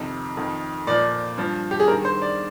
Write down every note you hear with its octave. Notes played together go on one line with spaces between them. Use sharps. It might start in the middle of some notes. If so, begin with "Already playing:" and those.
Already playing: F2 C3 D#3
F2 D#3
A#2 F3 D5
G2 F3
G4
G#4
G2 D#3 A#4
C5
D5